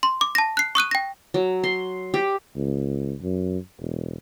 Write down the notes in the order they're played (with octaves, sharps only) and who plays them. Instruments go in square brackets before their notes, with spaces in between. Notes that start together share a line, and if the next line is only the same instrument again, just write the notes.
[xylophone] C6
D6
A5 A#6
F#6 C7
C#6 D#6 F#6 D#7
G5 A#6
[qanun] F#3
C6
G4
[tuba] C#2
F#2
E1